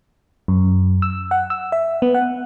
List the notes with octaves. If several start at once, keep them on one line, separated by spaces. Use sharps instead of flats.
F#2
E6
F#5
E6
E5
B3
F#5